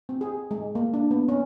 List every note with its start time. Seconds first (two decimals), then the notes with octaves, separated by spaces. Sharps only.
0.09 C4
0.21 G#4
0.51 G#3
0.75 A#3
0.94 D4
1.11 B3
1.29 C#4